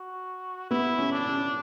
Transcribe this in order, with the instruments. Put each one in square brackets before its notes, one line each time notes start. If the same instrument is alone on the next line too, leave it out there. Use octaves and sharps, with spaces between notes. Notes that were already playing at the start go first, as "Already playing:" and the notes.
Already playing: [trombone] F#4
[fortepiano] B3 [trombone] E4
[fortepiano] C#4
[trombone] D4
[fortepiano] C#4